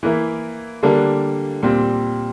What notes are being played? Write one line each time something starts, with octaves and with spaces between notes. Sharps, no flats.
E3 A#3 E4
D3 G3 A#3 D4
A#2 G3 C4